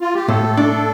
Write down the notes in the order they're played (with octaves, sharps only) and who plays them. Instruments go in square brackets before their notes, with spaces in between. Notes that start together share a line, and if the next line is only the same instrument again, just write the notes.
[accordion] F4
G4
[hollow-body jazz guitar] A2 [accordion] A4
[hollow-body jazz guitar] D4